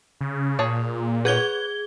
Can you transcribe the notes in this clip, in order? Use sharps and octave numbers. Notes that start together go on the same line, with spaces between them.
C#3
A#2 G#4 C#5 A5
G#4 B4 C#5 G#6 G7